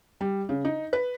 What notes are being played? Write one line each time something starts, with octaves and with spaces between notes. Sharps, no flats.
G3
C#3
D#4
B4